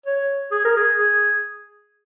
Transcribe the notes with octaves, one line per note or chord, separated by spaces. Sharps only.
C#5
G#4
A#4
G#4
G#4